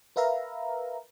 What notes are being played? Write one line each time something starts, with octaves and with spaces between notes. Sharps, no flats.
A#4 B4 E5 F5 A#5